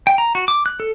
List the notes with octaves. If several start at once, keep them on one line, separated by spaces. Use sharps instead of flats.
G5
A#5
F#4
D6
F#6
A4